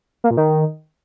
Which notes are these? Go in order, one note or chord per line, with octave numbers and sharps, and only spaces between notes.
A#3
A#2
D#3